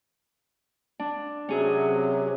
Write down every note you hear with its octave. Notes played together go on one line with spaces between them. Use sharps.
D4
C3 F#3 C#4 G#4